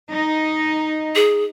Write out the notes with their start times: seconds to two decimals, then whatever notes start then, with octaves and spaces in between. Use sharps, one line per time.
0.11 D#4
1.15 G#4